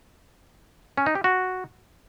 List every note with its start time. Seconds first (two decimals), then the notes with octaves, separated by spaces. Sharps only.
0.97 C#4
1.06 D#4
1.15 G4
1.24 F#4